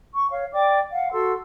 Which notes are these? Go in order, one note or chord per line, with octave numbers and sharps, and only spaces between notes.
C#6
C#5 F5
D5 G5 D6
F5 F#5
F#4 A4 C6 E6